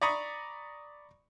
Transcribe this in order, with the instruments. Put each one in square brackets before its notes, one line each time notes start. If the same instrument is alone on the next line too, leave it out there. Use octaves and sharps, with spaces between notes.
[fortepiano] D5 A#5 B5 C#6 D#6